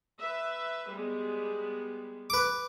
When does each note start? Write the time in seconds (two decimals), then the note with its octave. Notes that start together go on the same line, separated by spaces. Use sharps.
0.21 B4 E5
0.91 G3 G#3 B3
2.30 B4 D6